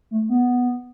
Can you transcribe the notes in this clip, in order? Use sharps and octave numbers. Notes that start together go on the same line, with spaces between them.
A3
B3